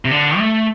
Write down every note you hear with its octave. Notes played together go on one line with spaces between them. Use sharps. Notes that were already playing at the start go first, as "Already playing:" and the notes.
C3
D3
A3